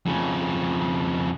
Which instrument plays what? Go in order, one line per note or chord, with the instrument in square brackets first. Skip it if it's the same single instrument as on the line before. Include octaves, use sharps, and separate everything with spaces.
[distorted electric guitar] F2 C#3